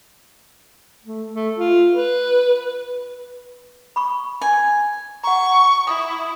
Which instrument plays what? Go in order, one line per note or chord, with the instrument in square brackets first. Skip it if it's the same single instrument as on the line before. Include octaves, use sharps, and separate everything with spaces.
[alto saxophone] A3
A3
F4
B4
[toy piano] B5 C#6
[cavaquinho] G#5
[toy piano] F#5 A#5 [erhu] C#6
[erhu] E4 [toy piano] D#6